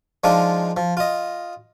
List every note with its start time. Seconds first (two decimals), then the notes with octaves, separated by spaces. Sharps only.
0.24 F3 G#3 D4 D#4 F4
0.77 F3
0.97 F4 D#5